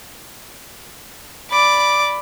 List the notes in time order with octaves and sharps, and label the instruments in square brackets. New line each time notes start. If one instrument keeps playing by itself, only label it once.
[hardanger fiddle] D5 D6 [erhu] B5